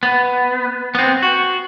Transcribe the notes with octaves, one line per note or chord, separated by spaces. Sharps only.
B3
B3 C4
F#4